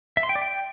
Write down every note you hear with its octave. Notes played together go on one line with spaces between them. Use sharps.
E5
C6
G5
D5
G5